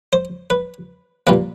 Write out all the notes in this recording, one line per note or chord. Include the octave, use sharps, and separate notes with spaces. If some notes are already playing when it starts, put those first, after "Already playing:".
C5
B4
A#2 G3 A#3 B4